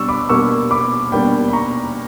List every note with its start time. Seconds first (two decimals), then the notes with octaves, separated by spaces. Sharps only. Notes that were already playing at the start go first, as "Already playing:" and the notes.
Already playing: B2 G3 D4 C#6 E6
0.08 B5 D6
0.29 B2 G3 A#3 D4 C#6 E6
0.71 B5 D6
1.12 B2 G3 A#3 D4 G5 B5
1.48 B5
1.53 A#5 C#6